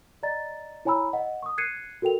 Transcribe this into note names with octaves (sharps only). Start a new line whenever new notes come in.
D5 D#5 A#5 A6
E4 C#5 G#5 A#5 B5 E6
D#5 F#5
C#6 D#6
F#6 G#6 C7 C#7 D#7
F#4 A4 A#4 G5 F7